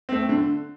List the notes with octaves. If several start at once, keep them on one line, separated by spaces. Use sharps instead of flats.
A3 C4
D3